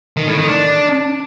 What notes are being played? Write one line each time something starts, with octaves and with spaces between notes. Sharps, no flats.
D#3
A2
D#3
D4